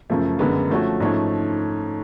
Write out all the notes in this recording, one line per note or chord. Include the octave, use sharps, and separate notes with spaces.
F#2 C#3 F3 A3
F#2 D3 G#3 B3
F3 A3 C#4 F#4
G#2 F3 A3 C#4